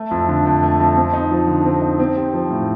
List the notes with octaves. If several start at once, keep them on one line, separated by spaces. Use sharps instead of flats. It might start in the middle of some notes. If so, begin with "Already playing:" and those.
Already playing: A3
F2
D3
F2
A3
F2
C4
D#4
F3
D3
C4
D#4
C4
G4
F3
A2